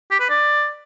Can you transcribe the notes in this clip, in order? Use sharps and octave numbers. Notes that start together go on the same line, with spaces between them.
G4
B4
D5